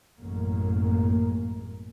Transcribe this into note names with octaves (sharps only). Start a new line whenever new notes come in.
A1 F#2 B2 G#3 A#3